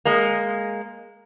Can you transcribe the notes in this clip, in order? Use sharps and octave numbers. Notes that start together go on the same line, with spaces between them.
G#3 A#3